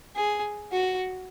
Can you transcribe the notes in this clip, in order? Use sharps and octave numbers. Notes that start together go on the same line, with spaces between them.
G#4
F#4